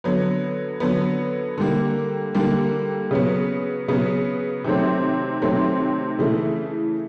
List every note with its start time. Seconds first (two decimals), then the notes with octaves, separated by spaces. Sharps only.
0.04 D3 F#3 B3
0.80 D3 F#3 B3
1.58 D3 G3 A#3
2.35 D3 G3 A#3
3.11 C#3 F#3 B3
3.88 C#3 F#3 B3
4.64 C3 D#3 F#3 A3 C4
5.42 C3 D#3 F#3 A3 C4
6.19 C#3 E3 A3